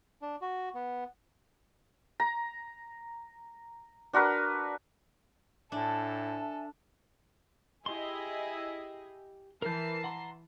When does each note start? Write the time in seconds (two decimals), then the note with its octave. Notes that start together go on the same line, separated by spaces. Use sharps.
0.22 D4
0.42 F#4
0.74 B3
2.20 A#5
4.13 D4 F#4 A#4 B4
5.72 A2 D4 A4 E5 G#5 A5
7.86 E4 G4 G#4 D#5 C6
9.62 E3 A#4 A5 G6 C7
10.04 F#5 A#5 C6